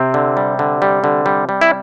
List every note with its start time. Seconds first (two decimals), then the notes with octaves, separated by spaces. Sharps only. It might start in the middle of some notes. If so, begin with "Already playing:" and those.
Already playing: C3 C4
0.14 D3
0.37 G3
0.59 D3
0.82 G3
1.04 D3
1.26 G3
1.49 G3
1.61 E4